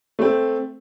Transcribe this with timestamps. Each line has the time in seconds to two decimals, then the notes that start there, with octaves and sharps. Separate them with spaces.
0.19 A3 C4